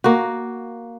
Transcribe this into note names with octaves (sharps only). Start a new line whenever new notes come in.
A#3 F#4